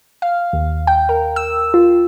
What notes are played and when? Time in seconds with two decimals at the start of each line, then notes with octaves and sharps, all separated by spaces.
0.22 F5
0.53 D#2
0.87 G5
1.09 A#4
1.36 E6
1.74 F4